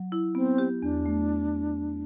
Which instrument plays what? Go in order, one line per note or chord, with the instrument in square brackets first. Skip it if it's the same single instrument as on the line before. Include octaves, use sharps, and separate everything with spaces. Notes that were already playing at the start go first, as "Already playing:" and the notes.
Already playing: [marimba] F#3
E4
[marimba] B3 [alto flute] C4
[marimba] G4
[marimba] E2 [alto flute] D4
[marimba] A3